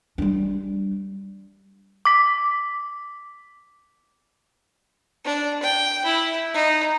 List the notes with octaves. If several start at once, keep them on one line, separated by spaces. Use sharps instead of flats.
G3 D4
D6 B6
D4
G5
E4
D#4